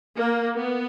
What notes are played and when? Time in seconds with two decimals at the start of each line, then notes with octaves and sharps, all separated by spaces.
0.15 A#3
0.56 B3